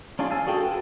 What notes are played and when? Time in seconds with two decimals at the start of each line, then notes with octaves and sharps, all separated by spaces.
0.19 C#4 D4 F4 G#4
0.31 F5 G#5 A5 E6
0.47 F#4 G#4 A4 G5
0.65 A4 B4